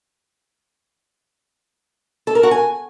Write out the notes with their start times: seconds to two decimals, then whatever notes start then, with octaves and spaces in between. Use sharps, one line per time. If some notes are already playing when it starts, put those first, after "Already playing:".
2.27 A4
2.35 A#4
2.43 F#4
2.51 G#5